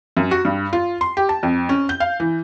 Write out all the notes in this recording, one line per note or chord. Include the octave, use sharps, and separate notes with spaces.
F#2
F#4
G2
F4
C6
G4
A5
F2
C#4
G6
F5
E3